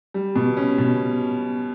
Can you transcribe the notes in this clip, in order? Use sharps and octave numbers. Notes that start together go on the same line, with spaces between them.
G3
B2
C#4
B2